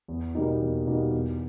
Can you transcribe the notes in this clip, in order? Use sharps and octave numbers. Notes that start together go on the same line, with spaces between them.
E2
B2 G3 A#3 D#4
E2
B2 G3 A#3 D#4
E2